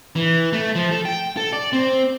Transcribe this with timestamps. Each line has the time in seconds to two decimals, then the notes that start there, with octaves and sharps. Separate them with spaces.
0.16 E3
0.53 A3
0.75 F3
0.91 A4
1.05 G5
1.37 A4
1.53 D5
1.73 C4